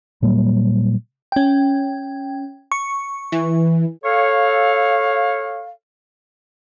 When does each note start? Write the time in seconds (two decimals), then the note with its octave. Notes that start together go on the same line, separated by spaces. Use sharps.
0.22 A#2 F#3 G3 A#3
1.32 C#4 G5
2.72 C#6
3.32 E3
4.04 A4 C#5 F5